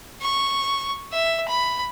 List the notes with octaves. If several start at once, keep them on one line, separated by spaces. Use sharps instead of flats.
C#6
E5
B5